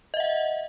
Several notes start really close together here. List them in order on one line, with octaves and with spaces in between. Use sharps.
D#5 E5 F#5